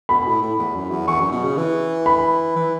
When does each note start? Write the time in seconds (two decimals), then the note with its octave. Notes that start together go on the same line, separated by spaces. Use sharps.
0.09 B2 B5
0.26 A2
0.42 A2
0.59 E2
0.75 F#2
0.91 E2
1.08 E2 C#6
1.20 F#2
1.32 B2
1.44 C#3
1.57 E3
2.06 B5
2.56 E3